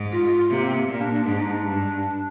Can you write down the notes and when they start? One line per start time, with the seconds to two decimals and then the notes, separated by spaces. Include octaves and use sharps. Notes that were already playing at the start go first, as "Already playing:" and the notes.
Already playing: G#2
0.12 F4
0.50 C3 A#3
0.64 C4
0.75 A#3
0.88 A#2 A#3
1.01 D4
1.14 D4
1.26 G#2 D4
1.39 D#4
1.51 D4
1.64 G2